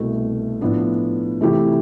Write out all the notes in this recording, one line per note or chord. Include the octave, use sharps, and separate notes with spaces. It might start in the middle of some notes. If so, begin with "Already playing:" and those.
Already playing: C2 B2 A3
A2 F3 B3 D4
C3 E3 A3 E4 G4